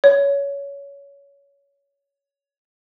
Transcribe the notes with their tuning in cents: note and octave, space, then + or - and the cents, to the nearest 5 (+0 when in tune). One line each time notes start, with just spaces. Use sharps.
C#5 +20